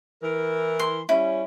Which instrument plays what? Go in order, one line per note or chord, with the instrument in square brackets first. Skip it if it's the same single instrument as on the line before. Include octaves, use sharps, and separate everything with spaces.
[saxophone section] E3 A#4
[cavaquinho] C6
[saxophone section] G3 C#4 [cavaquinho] E4